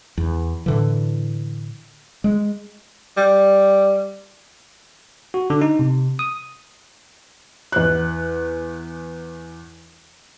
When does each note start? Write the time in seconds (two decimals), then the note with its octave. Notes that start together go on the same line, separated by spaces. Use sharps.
0.18 E2
0.66 A2 D3 E3
2.24 G#3
3.17 G3
5.34 F#4
5.50 D3
5.61 D#4
5.79 C3
6.19 D#6
7.72 E2 F#6